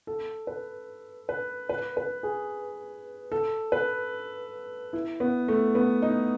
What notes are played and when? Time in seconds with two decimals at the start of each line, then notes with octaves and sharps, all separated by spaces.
0.07 A4
0.47 B4
1.29 B4
1.69 B4
1.97 B4
2.23 G#4
3.32 A4
3.72 B4
4.93 E4
5.20 B3
5.48 A3
5.75 B3
6.02 D#4